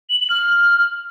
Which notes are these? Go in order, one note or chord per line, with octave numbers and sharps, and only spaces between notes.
F#7
F#7
F6